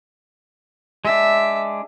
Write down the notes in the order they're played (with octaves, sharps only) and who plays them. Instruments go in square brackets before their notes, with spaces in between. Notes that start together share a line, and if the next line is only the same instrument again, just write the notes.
[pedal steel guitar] G#3 D4 [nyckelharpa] E5